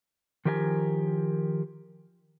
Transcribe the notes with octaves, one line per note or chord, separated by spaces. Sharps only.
D#3 F3 G4 A#4 E5 G#5